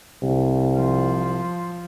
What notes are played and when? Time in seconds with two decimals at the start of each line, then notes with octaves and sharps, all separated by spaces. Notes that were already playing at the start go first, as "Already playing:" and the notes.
0.22 C2
0.76 F3